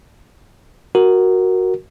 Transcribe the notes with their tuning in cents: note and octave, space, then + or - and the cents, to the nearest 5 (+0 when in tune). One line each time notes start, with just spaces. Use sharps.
F#4 +0 A#4 +0